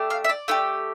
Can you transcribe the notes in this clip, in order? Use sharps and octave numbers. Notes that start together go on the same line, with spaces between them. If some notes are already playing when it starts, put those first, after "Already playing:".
Already playing: A3 D4 G4
F5
E5
D5
A3 E4 G4